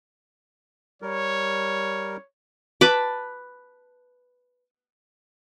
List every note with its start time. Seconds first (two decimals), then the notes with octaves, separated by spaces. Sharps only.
1.02 G3 A#4 C#5
2.81 B4 A5 B5 D6